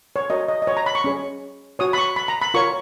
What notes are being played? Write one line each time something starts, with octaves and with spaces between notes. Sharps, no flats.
C#5
F#4 A#4 C#5 D#5
D#5
D#5
C#5
A#5
B5
C#6
C#4 G#4 C#5
F#4 C#5 D#6
B5
C#6
B5
A#5
B5
F4 A#4 C#5 C#6